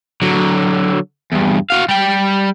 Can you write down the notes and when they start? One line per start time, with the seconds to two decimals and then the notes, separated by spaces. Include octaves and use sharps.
0.22 D3 F#3
1.32 E2 G2
1.70 F#4 F5
1.89 G3 G5